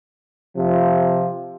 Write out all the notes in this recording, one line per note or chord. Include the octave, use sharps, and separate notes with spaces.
C3 F3